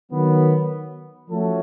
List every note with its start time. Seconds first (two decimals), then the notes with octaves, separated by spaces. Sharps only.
0.11 D#3 F#3 B3
1.29 F3 A3 C#4 F#4 A4